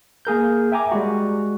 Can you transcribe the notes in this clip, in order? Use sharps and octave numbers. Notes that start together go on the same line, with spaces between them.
A#3 G#4 A#4 G6
E5 G5 G#5 A#5 D6
G3 G#3 F#4